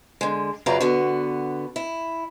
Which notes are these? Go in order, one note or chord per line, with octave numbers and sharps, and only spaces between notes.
D3 G#3
F#2 C#3 F4 B4 D5 A#5
D3 B3 F#4
E4